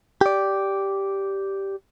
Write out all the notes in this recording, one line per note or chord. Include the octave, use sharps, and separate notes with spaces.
G4 D5